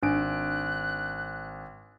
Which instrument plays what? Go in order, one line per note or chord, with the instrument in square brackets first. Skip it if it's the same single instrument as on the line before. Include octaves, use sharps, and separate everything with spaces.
[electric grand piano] G#1 D7 [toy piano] D4 [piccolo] F#6